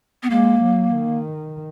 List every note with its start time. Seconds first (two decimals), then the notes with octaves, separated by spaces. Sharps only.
0.23 B3
0.30 G#3 A#3
0.62 F#3
0.94 D#3